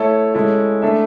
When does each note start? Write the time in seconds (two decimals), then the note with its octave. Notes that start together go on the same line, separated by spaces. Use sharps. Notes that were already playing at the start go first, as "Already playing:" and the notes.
Already playing: A3 E4 A4 C#5 E5
0.34 G#3 C#4 E4 A4
0.82 A3 D4 A4 E5